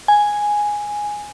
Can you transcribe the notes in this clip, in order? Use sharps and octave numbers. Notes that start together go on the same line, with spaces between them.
G#5